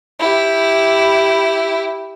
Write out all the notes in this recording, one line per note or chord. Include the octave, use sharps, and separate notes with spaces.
E4 G4